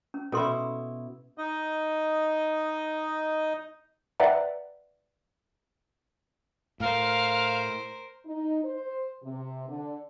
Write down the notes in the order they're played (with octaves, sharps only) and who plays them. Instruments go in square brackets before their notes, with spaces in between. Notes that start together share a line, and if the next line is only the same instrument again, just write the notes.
[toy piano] C#4
[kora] B2 E4 [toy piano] C#4 A4 C6
[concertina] D#4 D#5
[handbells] B4 D5 E5 F#5 G5 A#5
[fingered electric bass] A2 [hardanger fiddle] A#4 C5 [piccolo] F5
[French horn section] D#4
C5
C3
D3